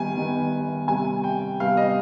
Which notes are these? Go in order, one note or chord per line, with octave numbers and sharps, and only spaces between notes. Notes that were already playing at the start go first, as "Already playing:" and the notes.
Already playing: D#3 G3 B3 G#5
D#3 G3 B3
C3 G3 B3 G#5
G5
C3 G3 B3 F5
D#5